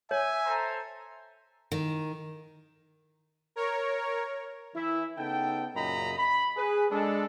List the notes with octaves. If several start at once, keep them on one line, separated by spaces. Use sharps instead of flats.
C#5 E5 G#5
A4 C5 A#5
D#3
A#4 C#5
E3 E4 E5
C#3 B3 D#4 A4 G5
F#2 A#2 C#3 D#5 A#5 B5
B5
G#4 B4
G#3 D4 A4